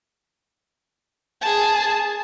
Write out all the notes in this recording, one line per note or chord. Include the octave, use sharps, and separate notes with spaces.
G#4 A5